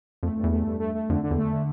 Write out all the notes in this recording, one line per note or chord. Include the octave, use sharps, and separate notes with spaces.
F2 A3
G2
E2
A3
G2
A3
A3
F2 D3
D3
E2
A3
D3